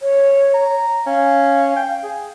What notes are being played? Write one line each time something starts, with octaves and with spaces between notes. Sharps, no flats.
C#5
A#5
C#4 F5
G5
G#4